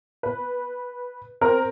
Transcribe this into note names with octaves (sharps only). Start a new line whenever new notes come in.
B4
C4 A#4 A#5